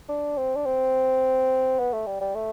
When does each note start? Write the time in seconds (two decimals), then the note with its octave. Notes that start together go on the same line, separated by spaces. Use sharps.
0.09 D4
0.37 C4
0.56 D4
0.65 C4
1.79 B3
1.93 A3
2.07 G3
2.20 G3
2.35 A3